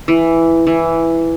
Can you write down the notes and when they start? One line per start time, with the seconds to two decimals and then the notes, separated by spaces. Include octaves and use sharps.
0.08 E3
0.67 E3